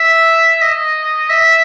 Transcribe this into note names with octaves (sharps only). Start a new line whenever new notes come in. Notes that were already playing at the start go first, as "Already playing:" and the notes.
Already playing: E5
D#5
E5